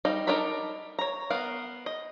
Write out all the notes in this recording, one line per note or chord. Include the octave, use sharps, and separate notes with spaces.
G3 D#4 D#5 F5
D4 D#4 A4 A#4 B5
C#5 A#5
B3 A#4 F5
D#5